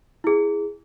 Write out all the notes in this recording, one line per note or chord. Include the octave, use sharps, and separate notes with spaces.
E4 G#4